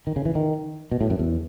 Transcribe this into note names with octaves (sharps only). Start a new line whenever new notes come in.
D#3
C#3
E3
D#3
B2
A2
F#2
E2